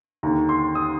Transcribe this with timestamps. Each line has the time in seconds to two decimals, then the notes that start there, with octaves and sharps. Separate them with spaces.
0.23 D#2 D3 A#5
0.49 C6
0.75 D#6